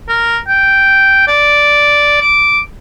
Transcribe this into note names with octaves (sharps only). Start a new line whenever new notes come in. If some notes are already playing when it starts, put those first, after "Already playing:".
A#4
G5
D5
D6